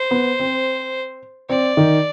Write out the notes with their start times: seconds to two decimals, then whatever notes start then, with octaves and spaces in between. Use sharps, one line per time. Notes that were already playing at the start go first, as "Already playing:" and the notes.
Already playing: C5
0.11 B3
0.40 C4
1.49 C4 D5
1.77 D#3 D#4